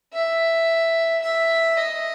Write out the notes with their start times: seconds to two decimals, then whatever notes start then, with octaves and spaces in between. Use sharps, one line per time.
0.14 E5
1.22 E5
1.77 D#5